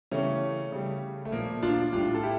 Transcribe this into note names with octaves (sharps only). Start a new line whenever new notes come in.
C#3 E3 G3 A3 C#4
C#3 G3
A3
A#2 F3 A#3
D4 F4
A2 G3 D4 F4
A4
E4 G4